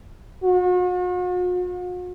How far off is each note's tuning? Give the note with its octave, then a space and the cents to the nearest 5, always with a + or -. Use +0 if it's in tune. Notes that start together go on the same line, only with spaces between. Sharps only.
F#4 -45